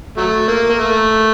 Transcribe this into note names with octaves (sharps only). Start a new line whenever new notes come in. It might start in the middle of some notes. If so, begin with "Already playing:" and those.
F#3 A3
A#3
A#3
A3